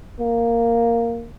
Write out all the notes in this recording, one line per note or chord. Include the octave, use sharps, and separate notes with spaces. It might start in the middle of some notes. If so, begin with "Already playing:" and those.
A#3